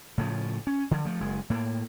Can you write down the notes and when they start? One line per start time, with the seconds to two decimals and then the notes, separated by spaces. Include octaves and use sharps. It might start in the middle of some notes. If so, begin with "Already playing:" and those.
0.18 A2 C#3 F3
0.67 C#4
0.91 D3 F3
1.05 F3 A3
1.20 F#1 G#3
1.50 A2 A#3